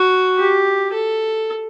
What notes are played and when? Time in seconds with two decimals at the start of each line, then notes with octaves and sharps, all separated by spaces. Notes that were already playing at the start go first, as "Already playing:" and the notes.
Already playing: F#4
0.38 G4
0.93 A4